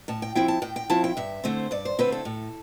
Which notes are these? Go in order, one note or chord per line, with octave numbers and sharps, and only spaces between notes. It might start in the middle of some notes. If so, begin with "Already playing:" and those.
A2 A5
G5
F3 C4 E4 G5
A5
A2 G5
G5
F3 C4 E4 A5
G5
G2 E5
D3 A3 C4 E4 C5
G2 D5
C5
D3 A3 C4 E4 B4
A4
A2